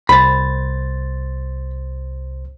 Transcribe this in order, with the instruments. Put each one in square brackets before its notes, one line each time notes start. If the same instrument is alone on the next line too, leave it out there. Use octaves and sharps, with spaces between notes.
[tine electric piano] C2 C5 A6 [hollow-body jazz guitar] B5